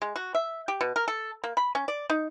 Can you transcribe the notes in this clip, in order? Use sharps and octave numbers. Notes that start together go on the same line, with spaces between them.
G#3
F#4
E5
G4
B2
A#4
A4
A#3
B5
C#4
D5
D#4